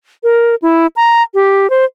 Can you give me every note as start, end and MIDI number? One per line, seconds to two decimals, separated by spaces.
0.23 0.55 70
0.62 0.87 64
0.96 1.23 82
1.34 1.69 67
1.70 1.85 72